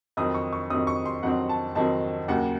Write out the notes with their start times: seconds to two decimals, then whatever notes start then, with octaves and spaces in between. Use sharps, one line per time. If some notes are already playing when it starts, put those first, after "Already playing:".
0.17 F2 D#3 F#3 C4 D#6
0.35 C#6
0.53 C#6
0.70 F2 D#3 F#3 C4 D#6
0.87 C#6
1.06 C6
1.23 F2 D#3 F#3 C4 F#5
1.49 A5
1.75 F2 D#3 F#3 C4 A5
2.28 D#2 C#3 F#3 A#3 F#5